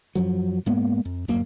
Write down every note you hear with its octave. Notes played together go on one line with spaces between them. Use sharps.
F#2 F3 F#3
G#2 G#3 A#3 B3
F2
D1 G1 F#2 A#3